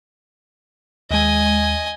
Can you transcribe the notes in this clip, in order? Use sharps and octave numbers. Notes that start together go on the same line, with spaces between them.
D#2 G#3 D#5 G#5